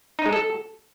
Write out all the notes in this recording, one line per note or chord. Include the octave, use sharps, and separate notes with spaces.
D#4
G#3
A4